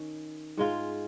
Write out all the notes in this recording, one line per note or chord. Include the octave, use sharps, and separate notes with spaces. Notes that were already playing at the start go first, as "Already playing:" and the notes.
Already playing: D#3 C#4
G#2 G#3 F4